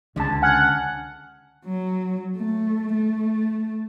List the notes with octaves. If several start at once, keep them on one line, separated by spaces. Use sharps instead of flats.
C#2 D3 C#4 A5
F#5 G#5 F6 G#6
F#3
A3
A3